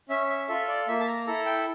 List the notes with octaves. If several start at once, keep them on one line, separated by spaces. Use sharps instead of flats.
C#4 E5
E5
F4 A4 E5
D5
A#3 E5
A5
A#5
E4 A4 A#5
G5